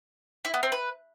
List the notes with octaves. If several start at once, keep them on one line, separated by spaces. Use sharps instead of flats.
E4
B3
C4
B4